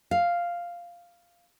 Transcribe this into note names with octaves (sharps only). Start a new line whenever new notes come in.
F5